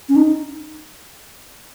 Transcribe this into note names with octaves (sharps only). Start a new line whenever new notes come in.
C#4
D#4